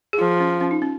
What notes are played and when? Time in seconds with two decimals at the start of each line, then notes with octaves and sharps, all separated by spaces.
0.13 G#4
0.19 F3 F4
0.40 C#4
0.61 C#4
0.71 D#4
0.82 C#4